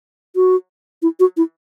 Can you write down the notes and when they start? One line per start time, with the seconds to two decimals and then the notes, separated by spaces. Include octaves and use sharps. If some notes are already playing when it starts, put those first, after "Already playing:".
0.36 F#4
1.02 E4
1.20 F#4
1.37 E4